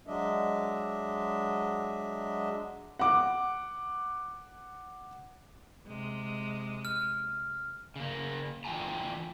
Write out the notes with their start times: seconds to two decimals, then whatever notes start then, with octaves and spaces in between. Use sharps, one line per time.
0.07 F#3 G#3 D4 D#5 E5
2.99 F#5 D6
5.87 C3 G#3
6.85 F6
7.96 C#3 A#3
8.65 D3 E3 F4 G5 G#5 A#5